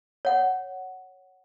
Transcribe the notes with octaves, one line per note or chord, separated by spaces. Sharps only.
C#5 F#5